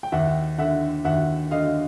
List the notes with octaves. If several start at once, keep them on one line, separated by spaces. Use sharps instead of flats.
G5
D#2 E5 F#5
D3 E5 F#5
D#2 E5 F#5
D3 D#5 F5